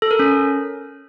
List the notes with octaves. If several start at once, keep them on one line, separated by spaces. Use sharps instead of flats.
A4
A#4
C#4